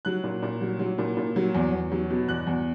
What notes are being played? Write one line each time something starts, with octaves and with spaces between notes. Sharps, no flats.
F#3 F#6
A#2
A#2
F#3
F#3
A#2
A#2
F#3
E2
E2
F#3
B2
E2 F#6
E2